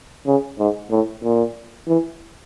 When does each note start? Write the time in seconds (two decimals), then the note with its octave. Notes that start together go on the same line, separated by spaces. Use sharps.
0.27 C#3
0.59 G#2
0.91 A2
1.23 A#2
1.87 E3